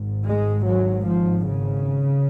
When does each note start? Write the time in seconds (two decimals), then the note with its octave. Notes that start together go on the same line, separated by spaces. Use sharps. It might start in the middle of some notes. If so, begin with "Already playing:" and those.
Already playing: G#1 G#2
0.27 G#3
0.67 F#3
1.07 F3
1.47 C#3